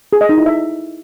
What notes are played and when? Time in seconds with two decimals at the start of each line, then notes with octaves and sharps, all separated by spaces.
0.13 G#4
0.21 D#5
0.29 D#4
0.38 E4
0.46 E5